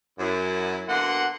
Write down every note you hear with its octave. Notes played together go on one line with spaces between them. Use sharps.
F#2 E4
D3 A#3 B3 F#4 F#5 C6